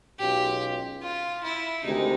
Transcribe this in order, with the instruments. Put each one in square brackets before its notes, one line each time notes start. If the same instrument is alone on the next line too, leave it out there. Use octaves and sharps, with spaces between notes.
[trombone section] B1 B2 G#3 C#4 F4 [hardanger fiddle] G4
[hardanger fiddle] F4
E4
[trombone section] D2 C3 D#3 G#3 [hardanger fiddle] D#4